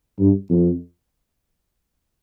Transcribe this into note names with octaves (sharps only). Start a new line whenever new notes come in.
G2
F2